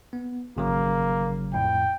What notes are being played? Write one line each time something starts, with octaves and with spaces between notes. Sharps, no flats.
B3
G#1 C#3 F#3 A#3
F2 A2 G5